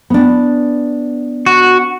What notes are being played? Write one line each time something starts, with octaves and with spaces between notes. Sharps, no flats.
B3 D4
F#4